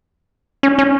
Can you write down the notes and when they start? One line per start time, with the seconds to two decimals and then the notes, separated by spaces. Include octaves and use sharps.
0.63 C#4
0.78 C#4